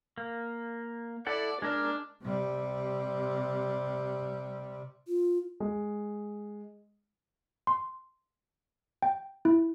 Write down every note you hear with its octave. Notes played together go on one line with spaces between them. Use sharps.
A#3
E4 A4 D5 F#5
G#3 D4 A#4 F6
C3 G3
F4
G#3
C6
G5
E4